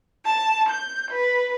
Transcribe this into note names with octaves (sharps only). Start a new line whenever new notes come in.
A5
G6
B4